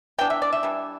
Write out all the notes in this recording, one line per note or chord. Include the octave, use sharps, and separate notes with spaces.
E3 B3 D4 G5
E5
D5
E5
E3 G3 D4